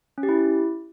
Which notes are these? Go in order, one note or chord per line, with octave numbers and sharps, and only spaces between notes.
C#4
G4
E4